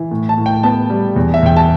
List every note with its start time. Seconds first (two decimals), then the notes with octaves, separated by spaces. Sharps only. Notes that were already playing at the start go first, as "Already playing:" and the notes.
Already playing: E3
0.11 A2
0.29 A5
0.37 A2
0.46 G5
0.63 B3 A5
0.90 G3
1.16 E2
1.34 E5
1.43 E2 G5
1.57 A5